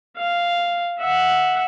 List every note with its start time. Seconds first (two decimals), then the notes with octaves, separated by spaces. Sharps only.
0.17 F5
0.99 E5 F#5